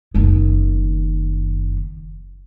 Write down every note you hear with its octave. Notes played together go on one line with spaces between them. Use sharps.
F#1 D#3